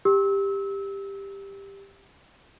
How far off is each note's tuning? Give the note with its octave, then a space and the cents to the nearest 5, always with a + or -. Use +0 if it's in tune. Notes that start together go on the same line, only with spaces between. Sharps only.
G4 +10 E6 -25